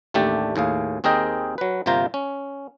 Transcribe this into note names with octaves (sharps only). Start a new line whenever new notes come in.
A1 D#2 A3 D4 G4 D5
D#2 A2 G#4 F5
D#2 C4 G#4 A#4 D#5 G5
F#3 B4
G1 C3 A#3 F4 C5 A#5
C#4